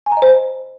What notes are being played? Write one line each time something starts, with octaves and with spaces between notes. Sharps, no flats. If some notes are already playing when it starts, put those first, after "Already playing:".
G#5
A#5
D#5
C5